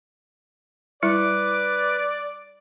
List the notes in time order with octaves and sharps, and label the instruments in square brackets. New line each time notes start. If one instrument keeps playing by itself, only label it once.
[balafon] G3 E4 [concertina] B4 [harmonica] D5 [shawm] D6